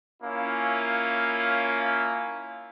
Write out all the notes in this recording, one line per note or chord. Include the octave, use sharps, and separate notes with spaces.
A#3 C#4 E4 F4